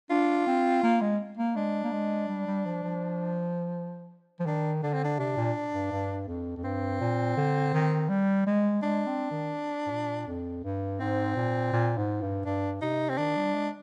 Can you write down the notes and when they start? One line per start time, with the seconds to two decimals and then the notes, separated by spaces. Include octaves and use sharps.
0.10 D4 F4
0.47 C4
0.84 A#3
1.01 G#3
1.38 A#3
1.56 G#3 D4
1.84 A#3
1.92 G#3
2.29 G3
2.47 G3
2.66 F3
2.83 F3
4.40 F3
4.46 D#3 D4
4.83 D3 D4
4.93 C4
5.04 D4
5.19 C3 D4
5.37 A#2
5.73 G2
5.91 G2
6.28 F2
6.57 F2
6.64 G2 C4
7.01 A#2
7.37 D3
7.74 D#3
8.09 G3
8.47 G#3
8.83 G#3 D4
9.07 C4
9.31 D#3
9.86 G#2
9.91 A#2
10.28 F2
10.64 G2
11.00 G#2 C4
11.37 A#2
11.73 A#2
11.97 G#2
12.22 G2
12.45 G2 D4
12.81 C3 D#4
13.09 C4
13.18 D#3 D4
13.37 G3
13.54 G#3